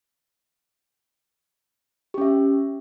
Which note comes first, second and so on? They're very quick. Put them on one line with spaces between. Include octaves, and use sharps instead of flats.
G4 C#4 E5